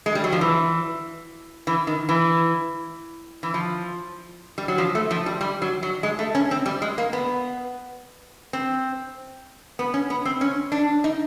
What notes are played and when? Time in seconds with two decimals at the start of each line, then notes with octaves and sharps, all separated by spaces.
0.06 G#3
0.15 G3
0.24 F#3
0.32 F3
0.41 E3
1.67 E3
1.87 D#3
2.09 E3
3.43 E3
3.54 F3
4.58 G3
4.68 F#3
4.78 F3
4.95 A3
5.11 F3
5.26 G3
5.41 G3
5.62 F#3
5.83 F#3
6.03 G#3
6.19 A3
6.35 C#4
6.51 C4
6.66 G3
6.82 G#3
6.98 A#3
7.13 B3
8.53 C4
9.79 B3
9.94 C#4
10.10 B3
10.25 C4
10.41 C#4
10.72 D4
11.04 D#4